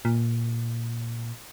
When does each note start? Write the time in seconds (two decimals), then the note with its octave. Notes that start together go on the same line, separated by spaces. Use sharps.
0.05 A#2